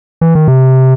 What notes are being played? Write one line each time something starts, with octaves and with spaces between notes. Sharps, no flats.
E3
D#3
C3